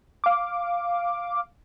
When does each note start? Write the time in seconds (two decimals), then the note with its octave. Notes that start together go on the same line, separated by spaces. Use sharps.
0.24 F5 D6